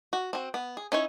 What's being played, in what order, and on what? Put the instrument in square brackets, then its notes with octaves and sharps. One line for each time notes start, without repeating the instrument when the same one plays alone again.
[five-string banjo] F#4
C4 F#4
B3
G#4
C#4 D#4 E4 C#5